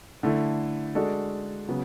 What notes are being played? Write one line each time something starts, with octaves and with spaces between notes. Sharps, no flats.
D3 A3 E4
G#3 D4 F#4 A4
C#3 F#3 B3